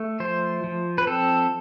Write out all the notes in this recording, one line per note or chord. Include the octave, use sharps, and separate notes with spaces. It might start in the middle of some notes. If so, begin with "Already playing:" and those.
Already playing: A3
F3 C5
F3
B4
C4 A4